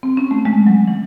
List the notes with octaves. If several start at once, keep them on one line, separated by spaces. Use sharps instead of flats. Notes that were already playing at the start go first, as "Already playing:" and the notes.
C4
C#4
A3
G#3
F#3
E3